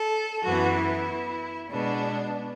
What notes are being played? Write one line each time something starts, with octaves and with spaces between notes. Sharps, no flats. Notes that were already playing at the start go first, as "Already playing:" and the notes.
Already playing: A4
F#2 E3 B3 F#4
E4
B2 G#3 B3 D4